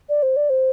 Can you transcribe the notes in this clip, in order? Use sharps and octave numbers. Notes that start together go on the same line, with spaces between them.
D5
C5
D5
C5